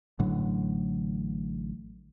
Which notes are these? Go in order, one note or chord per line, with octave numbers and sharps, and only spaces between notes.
A1 A2 D3 F#3